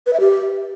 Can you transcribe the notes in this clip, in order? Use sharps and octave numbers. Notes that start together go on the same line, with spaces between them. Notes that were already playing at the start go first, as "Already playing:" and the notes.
B4
E5
G4